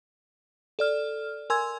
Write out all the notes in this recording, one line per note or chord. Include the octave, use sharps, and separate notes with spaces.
A4 D5 F6
A#4 G#5 C6 E6 G#6